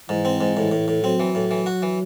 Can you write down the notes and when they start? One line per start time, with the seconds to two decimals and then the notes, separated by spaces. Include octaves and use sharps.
0.09 G#2 E3
0.25 C4
0.41 G#2
0.57 A2 E3
0.72 A2
0.88 A2
1.03 F#3 C4
1.20 E3
1.35 A2
1.51 E3
1.66 F#4
1.82 E3